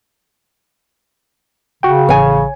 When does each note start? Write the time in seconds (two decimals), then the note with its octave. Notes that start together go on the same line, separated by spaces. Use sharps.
1.83 C#3 F#4 G5
2.09 A1 C#5 G#5